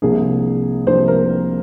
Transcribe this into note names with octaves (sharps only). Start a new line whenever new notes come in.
C2 C3 F3 A#3 D4 G#4
C2 C3 F3 A#3 D4 C5
A#4